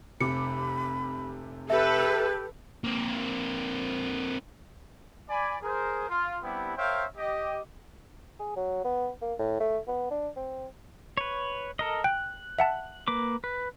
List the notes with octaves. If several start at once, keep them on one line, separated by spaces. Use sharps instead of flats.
F1 C3 B5 D6 C#7
G4 A4 B4 E5
A#3 C4
D5 G#5 B5
G#4 A#4 C5
F4
G3 B3 C4 D4 E4 G4
A#4 C5 C#5 E5 F5 G5
G4 D#5
G#4
F#3
B3
A#3
A2
A3
B3
D4
C4
B4 C#5
A4 A#4 D#5
G5 F#6
E5 F#5 A5
A#3 B4 D6
B4